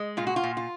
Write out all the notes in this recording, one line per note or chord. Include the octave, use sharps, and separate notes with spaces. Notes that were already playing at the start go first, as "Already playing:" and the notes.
Already playing: G#3
A#2 F4
F#4
F4
A#2
F4